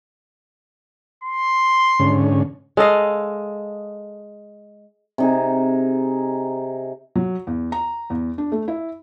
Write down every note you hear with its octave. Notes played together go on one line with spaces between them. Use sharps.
C6
G#2 D3 C#4
G#3 A4 D#5 F5
C3 D#4 G#4
F#3
E2
A#5
E2
D4
A3
E4